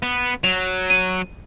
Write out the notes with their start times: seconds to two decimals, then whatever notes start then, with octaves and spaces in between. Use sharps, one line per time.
0.03 B3
0.44 F#3 F7
0.90 D#7